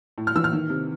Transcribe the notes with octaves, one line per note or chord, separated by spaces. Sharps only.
A2
F6
E3 E6
F6
D#3
C3